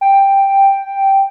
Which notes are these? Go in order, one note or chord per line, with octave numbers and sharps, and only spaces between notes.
G5